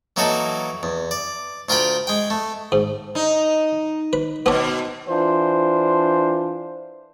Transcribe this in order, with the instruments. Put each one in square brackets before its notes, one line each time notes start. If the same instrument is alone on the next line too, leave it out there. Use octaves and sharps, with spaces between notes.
[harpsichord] E3 F#3 A#3 D#4 F#4 A4
E2
D5
D2 F4 A#4 G5 B5
G#3 G5
A3
G#2
[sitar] D#4
[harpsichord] B4
[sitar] B2 [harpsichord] B3 C#5
[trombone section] E3 D4 F4 C5